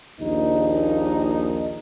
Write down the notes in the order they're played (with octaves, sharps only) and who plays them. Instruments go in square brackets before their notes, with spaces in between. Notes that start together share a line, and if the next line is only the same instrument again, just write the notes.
[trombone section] A#1 D#2 D#4